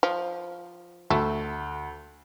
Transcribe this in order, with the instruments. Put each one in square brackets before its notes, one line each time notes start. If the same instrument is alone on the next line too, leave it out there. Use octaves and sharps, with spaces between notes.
[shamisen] F3
[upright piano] D2 [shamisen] A3